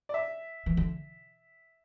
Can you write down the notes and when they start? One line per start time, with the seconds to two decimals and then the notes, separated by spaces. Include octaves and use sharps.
0.09 D5
0.14 E5
0.66 E3
0.77 D3